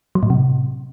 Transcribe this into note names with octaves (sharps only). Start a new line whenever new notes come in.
F#3
A2
C3